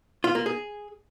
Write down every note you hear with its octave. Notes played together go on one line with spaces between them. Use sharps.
F4
A#3
G#4